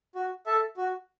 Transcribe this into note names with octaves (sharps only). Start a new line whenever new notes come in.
F#4
A4 E5 A5
F#4